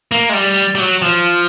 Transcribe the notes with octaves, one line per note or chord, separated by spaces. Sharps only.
A#3
G#3
G3
G3
F#3
F3